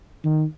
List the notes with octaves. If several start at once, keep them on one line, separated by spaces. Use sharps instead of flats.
D#3